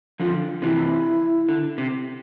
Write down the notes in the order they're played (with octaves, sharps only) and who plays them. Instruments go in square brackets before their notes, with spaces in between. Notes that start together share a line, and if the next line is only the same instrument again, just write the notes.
[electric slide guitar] D3 F3 [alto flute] F4
[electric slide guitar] C3 E3 [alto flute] E4
[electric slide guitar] D3
C3